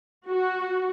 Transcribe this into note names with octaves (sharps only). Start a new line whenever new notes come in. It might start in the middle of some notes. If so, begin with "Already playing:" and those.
F#4